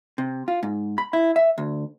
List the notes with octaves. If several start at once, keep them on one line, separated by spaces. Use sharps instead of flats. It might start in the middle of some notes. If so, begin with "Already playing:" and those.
C3
F4
G#2
B5
E4
E5
D2